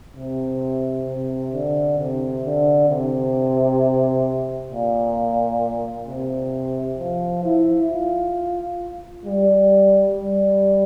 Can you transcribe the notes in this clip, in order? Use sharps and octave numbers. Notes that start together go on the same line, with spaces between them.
C3
C3
D3
C3
D3
C3
A#2
C3
F3
E4
F4
G3
G3